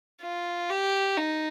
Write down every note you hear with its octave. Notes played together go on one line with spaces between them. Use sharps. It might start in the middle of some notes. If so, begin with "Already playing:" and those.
F4
G4
D#4